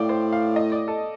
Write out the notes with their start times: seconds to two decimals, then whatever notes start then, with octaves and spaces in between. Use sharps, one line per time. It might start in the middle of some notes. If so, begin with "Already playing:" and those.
Already playing: A2 D5 F5 G5
0.09 C5
0.32 F5
0.56 D#5
0.72 D5
0.88 A4